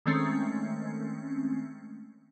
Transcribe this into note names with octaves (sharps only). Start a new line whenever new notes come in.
D#3 G#3 A3 C4 C#4